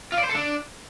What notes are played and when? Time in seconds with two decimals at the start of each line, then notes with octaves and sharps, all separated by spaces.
0.12 F4
0.18 D5
0.23 C5
0.29 A4
0.35 D4